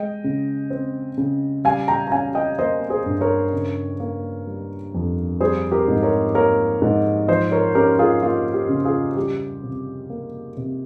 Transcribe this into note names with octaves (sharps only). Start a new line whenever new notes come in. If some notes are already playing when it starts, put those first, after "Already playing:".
Already playing: G#3 D#5 G5
C#3
C4
C#3
G3 F5 G#5
G5 A#5
A#5
C#4 F5 G#5
D#5 G5
A#3 C5 D#5
G#4 C5
G2
A#4 C#5
C#3
A#3
G3
F2
G3 G#4 C5
G4 A#4
G#2
A#4 C#5
A#3 A#4 C#5
G#2
F3 C5 D#5
A#4 C#5
C#4 G4 A#4
F4 G#4
A#3 F4
G4
C#3
F4 G#4
G3 G4
C3
A#3
C3